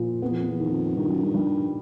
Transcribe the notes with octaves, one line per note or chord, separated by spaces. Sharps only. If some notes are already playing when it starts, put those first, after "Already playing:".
Already playing: A#2 F3
F2 B3
E2
F2
E2
D#3
F2
G2 D#3
F#2
G2
G3